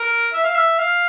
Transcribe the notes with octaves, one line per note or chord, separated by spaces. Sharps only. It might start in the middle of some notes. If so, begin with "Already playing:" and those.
Already playing: A#4
E5
F5
E5
F5